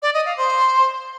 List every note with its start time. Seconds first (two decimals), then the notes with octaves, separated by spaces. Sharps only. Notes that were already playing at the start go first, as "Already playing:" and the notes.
0.02 D5
0.13 D#5
0.25 F5
0.36 C5